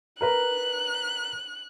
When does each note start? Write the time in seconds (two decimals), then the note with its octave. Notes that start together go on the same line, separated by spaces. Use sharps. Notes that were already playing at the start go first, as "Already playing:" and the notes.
0.21 A#4 B4 A#5 F#6